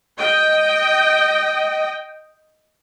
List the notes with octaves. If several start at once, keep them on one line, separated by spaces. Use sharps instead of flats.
D#5 G5